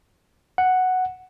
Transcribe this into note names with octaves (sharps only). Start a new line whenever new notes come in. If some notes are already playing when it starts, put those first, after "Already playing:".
F#5